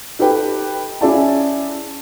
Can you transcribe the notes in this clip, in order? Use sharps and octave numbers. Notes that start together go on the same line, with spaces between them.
D#4 G4 A4 B4 G5
C#4 E4 G#4 D5 E5 A5